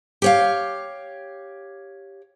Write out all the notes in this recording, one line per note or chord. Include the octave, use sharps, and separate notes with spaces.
G4 C#5 F5